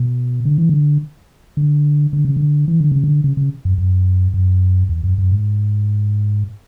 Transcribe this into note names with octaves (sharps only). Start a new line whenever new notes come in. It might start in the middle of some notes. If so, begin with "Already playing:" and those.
Already playing: B2
D3
E3
D3
D3
D3
C#3
D3
E3
D3
C#3
D3
C#3
C#3
F#2
F#2
F#2
E2
F#2
F#2
G#2